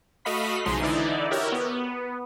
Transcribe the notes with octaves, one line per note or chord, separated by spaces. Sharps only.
A3 F#4 D#5 F5 B5 B6
B1 C#3 F3 G#3 D#4 C6
D3 E3 D#4 E4 D5
E4 F#4 G4 A#4 C#5 G5
B3